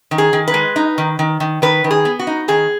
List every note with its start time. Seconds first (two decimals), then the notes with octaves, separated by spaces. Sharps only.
0.11 D#3
0.18 G#4
0.33 D#3
0.48 B4
0.54 G#3
0.76 D#4
0.98 D#3
1.19 D#3
1.40 D#3
1.62 D#3 B4
1.84 D#3
1.91 G#4
2.05 B3
2.19 F#4
2.27 D#4
2.48 D#3 G#4